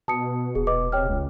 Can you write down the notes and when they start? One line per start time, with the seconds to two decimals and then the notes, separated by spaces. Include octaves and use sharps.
0.08 B2 A5 D#6 C#7
0.55 D#1 G#4
0.67 B4 D#5 D6
0.92 C3 C#5 G5 F6
1.09 C#2